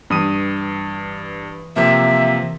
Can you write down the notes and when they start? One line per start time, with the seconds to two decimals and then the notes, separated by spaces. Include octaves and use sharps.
0.10 G2 E3 D#6 D#7
1.76 C3 F3 A#3 E5